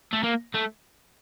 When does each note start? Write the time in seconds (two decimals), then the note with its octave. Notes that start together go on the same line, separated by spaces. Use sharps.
0.13 A3
0.24 A#3
0.55 A3